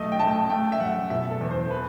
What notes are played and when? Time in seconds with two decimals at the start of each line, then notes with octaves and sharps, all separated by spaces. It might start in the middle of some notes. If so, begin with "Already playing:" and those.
Already playing: B1 A3 D#5
0.12 G5
0.19 A3 A5
0.50 A3 G5
0.72 E5
0.80 F#2 F#5
1.10 B2 E5
1.31 A4
1.41 E2
1.51 C5
1.71 B4